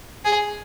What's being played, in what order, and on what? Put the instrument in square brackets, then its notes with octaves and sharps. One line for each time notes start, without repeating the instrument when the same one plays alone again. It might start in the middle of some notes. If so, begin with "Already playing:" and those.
[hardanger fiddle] G#4